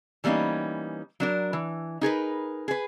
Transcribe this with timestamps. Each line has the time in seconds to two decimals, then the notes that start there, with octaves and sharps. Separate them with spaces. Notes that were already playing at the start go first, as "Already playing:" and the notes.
0.24 E3 G3 A#3 B3 C#4 D#4
1.20 F#3 D4 A#4
1.53 E3
2.01 D#4 G#4 A#4 B4
2.68 G#4 B4